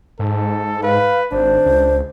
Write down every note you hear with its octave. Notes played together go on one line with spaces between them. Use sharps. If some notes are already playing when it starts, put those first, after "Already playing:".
G#2 A4
B4 F5
G#1 D4 C5
C#2